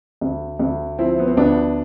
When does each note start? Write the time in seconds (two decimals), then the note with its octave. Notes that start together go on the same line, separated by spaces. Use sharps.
0.21 D2
0.59 D2
0.98 F3 C4 E4
1.19 B3
1.28 C4
1.37 D2 B3 D4